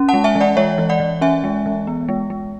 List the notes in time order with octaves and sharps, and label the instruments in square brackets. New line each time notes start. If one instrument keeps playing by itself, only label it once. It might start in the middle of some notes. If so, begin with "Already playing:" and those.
Already playing: [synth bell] C#4
F#5 A5
G#3
E5 G#5
E3
D5 F#5
G#3 C#5 E5
E3
D5 F#5
E3
C#4 E5 G#5
G#3
E3
B3
G#3
G#3